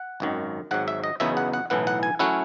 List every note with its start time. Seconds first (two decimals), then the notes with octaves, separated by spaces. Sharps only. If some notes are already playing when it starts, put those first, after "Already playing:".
Already playing: F#5
0.20 G#1 F#2 D#3
0.71 G#1 G#2 F#3 F#5
0.88 E5
1.04 D#5
1.20 E2 C#3 F#3 B3 D#4 E5
1.37 F#5
1.54 F#5
1.70 B1 A2 E3 B3 F#5
1.87 F#5
2.03 G#5
2.19 F#3 A3 C#4 E4 F#5